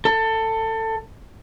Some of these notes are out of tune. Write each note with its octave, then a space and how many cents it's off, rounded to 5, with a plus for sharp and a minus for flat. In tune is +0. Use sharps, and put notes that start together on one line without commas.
A4 +20